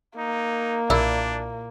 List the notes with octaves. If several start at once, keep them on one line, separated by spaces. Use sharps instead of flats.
A#3 D#4
B1 A#2 D4 E4